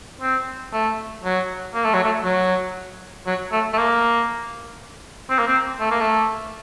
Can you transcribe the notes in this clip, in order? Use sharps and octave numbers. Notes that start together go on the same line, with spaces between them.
C4
A3
F#3
A#3
A3
F#3
A3
F#3
F#3
A3
A3
A#3
C4
A#3
C4
A3
A#3
A3